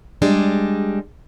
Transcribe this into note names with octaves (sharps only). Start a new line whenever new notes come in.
G3 G#3 D4